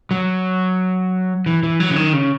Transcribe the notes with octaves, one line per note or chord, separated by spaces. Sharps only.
F#3
E3
E3
F#3
C#3
D#3
C#3